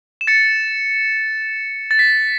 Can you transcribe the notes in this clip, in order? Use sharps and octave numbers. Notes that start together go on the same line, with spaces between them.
E7
A6 C#7
A6
B6